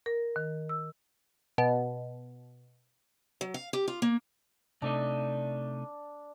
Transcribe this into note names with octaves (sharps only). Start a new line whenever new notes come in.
A#4
D#3
E6
B2
F#3
F5
G4
F4
A#3
C3 A3 D4 D#4